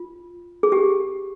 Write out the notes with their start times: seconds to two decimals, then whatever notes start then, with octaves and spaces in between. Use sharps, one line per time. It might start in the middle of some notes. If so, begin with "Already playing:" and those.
Already playing: F4
0.63 G#4
0.72 G4